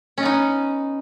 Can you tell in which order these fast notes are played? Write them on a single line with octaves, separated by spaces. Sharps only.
C#4 D#5 B3 D#4